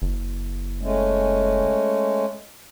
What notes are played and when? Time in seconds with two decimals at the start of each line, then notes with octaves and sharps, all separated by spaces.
0.02 F#1
0.81 G#3 A3 C#4